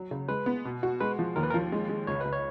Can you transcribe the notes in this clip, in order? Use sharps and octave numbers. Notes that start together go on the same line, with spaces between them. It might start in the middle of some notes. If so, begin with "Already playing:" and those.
Already playing: F#3
C#3
G#3 B4
B3
B2
F#4
G#3 B4
F3
D#2 A#4
B4
A#4
F3
G#3
G#3
C#2 C#5
C#2 B4
C#5